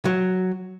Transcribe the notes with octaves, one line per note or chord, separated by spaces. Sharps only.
F#3